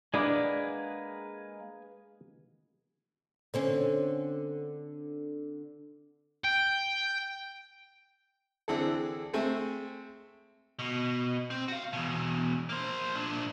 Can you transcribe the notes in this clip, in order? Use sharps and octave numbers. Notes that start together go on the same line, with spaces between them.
G#3 A#3 D4 G#4 B4 D5 F#5 B5
D3 C4 C#4
G5
D3 E3 C4 G#4 A4
G#3 A3 C4 G#5
B2
C4
F#4 F5
E2 B2
A#3 C5
A#2 D4